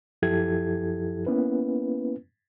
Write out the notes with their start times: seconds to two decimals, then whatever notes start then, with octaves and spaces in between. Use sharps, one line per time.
0.22 F#2 F3 E4 G4 A4 G#6
1.27 A#3 B3 C#4 E4 B4